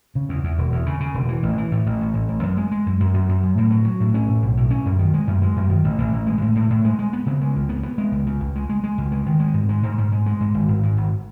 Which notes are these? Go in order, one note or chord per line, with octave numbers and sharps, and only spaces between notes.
C#3
E2
E2
E1
E2
C#3
C#3
E1
E3
A1
E3
A2
A1
A1
A1
A1
F#2
G#3
G#3
F#2
F#2
F#2
F#2
F#2
A2
F#3
F#3
A2
C#4
A2
B1
A2
C#4
F#2
D#3
G#3
F#2
G#3
F#2
D#3
A1
A1
A1
G#3
A2
A2
A2
G#3
G#3
B3
C#3
G#3
C#2
B3
B3
G#3
C#2
C#3
C#2
G#3
G#3
G#3
C#2
G#3
D#3
G#3
G#2
G#3
G#2
G#2
G#3
G#3
G#2
G#1
G#1
G#2
G#1